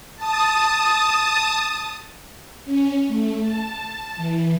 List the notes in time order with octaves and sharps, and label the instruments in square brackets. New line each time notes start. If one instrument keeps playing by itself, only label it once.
[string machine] A5 D#6
C#4
A3
A5
E3